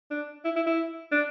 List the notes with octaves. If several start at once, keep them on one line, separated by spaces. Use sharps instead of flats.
D4
E4
E4
E4
D4